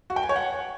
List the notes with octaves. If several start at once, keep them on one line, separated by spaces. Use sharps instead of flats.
F#4
G5
G#5
C#5
F#5